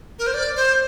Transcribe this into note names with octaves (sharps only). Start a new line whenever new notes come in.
A#4
C5
D5
C5